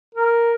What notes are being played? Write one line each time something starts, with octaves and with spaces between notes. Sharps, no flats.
A#4